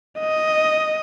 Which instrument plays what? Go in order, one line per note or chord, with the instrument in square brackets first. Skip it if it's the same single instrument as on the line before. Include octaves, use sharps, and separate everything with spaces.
[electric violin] D#5